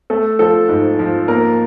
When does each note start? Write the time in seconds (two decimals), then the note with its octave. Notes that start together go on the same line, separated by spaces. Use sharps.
0.10 A3 A4
0.39 F3 A4
0.68 G#2
0.99 F3
1.28 A#3 A#4